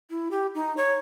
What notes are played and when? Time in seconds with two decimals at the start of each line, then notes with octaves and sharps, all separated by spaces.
0.10 E4
0.31 G4
0.55 D#4
0.77 C#5